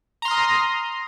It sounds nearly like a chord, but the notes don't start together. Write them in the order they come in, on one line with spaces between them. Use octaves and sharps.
A#5 C6 F6 D#6